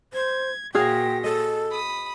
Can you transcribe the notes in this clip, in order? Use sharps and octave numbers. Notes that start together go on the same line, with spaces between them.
C5 G#6
A#2 F#4 G#4 F5 G5 A#6
A4 D#5
B5 D#6